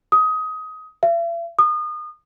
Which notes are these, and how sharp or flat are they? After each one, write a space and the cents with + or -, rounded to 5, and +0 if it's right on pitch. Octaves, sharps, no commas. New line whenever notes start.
D#6 +20
E5 +45
D#6 -30